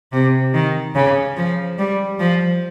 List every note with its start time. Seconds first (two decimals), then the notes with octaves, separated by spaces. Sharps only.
0.12 C3
0.54 D#3
0.95 C#3
1.36 F3
1.78 G3
2.19 F3